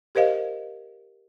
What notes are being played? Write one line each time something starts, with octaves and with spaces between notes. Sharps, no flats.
G4 A#4 C5 D#5 F5